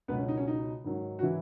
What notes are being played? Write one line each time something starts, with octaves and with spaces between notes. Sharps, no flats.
C#2 B2 F#3 B3 B4
C#4
D#4
C#4
D#4
G#2 D#3 F#3
F#4
E3 E4